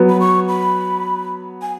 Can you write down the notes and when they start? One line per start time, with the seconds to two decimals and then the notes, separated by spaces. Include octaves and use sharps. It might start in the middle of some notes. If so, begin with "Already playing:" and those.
Already playing: F#3 B3
0.09 B5
0.20 C#6
0.49 B5
1.62 G#5